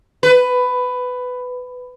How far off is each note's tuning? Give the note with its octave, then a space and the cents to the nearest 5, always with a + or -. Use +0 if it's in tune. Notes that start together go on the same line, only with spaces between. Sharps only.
B4 +15